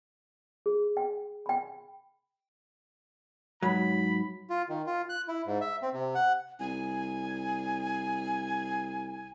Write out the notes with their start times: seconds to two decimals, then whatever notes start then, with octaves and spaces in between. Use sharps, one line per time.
0.66 G#4
0.97 G5
1.46 G5 B5
3.63 G#2 F#3 B5
4.50 F4
4.69 D#3
4.86 F4
5.09 F#6
5.28 E4
5.46 G#2
5.61 E5
5.82 C4
5.94 C3
6.15 F#5
6.60 C2 G#5